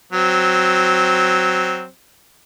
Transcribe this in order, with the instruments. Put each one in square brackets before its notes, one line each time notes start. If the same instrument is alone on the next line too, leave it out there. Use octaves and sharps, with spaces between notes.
[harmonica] F#3 C4